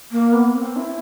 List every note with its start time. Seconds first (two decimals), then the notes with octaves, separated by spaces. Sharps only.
0.11 A#3
0.32 B3
0.54 C4
0.76 E4